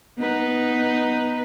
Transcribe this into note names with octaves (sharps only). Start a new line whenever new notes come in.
B3 D#4 B4